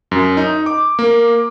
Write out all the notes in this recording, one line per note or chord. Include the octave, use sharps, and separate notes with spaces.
F#2
D#4
D6
A#3